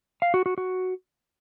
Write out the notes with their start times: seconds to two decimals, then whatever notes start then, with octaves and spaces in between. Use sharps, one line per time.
0.22 F5
0.34 F#4
0.46 F#4
0.58 F#4